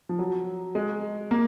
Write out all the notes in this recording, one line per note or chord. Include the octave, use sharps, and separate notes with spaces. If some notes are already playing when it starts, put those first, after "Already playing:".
F3
F#3
G#3
A#3